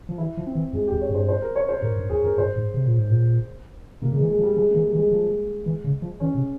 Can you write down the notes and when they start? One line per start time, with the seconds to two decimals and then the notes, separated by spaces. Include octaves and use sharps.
0.09 F3
0.18 E3 E4
0.37 F3
0.46 C4
0.55 E3
0.73 F2 G#3
0.87 E2 G4
1.01 C#5
1.09 G2
1.15 C5
1.28 C5
1.42 A#4
1.56 C#5
1.69 C5
1.82 G#2 A#4
1.96 G2
2.10 E2 G#4
2.24 F2 A#4
2.38 G2 C5
2.56 G#2
2.74 C3
2.86 A#2
2.98 G#2
3.10 A#2
4.02 C3 A#3
4.11 C#3
4.15 G#3
4.20 E3
4.29 G#3
4.38 F3
4.43 G3
4.57 F3 G#3
4.70 E3 A#3
4.84 G3
4.93 E3
4.98 G#3
5.11 F3
5.66 E3
5.84 C#3
6.02 F3
6.20 E3 C#4
6.35 C3